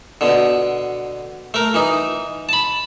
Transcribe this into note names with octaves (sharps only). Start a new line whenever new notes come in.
B2 D3
A3 A#4
E3 D#4
A5 B5